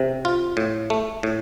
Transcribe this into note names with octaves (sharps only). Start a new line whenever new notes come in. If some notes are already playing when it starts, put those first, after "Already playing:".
Already playing: C3
F4
A2
A3
A2